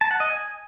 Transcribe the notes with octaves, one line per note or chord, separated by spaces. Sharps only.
A5
F#5
D#5
G#5